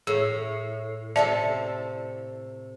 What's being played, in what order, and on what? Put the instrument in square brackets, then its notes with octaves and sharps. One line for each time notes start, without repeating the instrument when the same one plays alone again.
[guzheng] A2 [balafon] G#4
[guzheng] C3 C4 A4 [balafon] D5 E5 A5